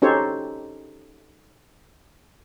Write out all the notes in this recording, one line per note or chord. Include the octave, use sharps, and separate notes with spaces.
C#4 D#4 G4 A4 C5 C#5